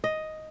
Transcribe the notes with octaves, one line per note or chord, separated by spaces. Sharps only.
D#5